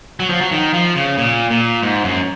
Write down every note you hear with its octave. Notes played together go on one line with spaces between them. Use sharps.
F#3
F3
F#3
D#3
F3
C#3
A#2
A#2
G#2
F#2